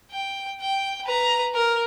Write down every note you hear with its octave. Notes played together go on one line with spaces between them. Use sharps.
G5
G5
B4 A#5
A#4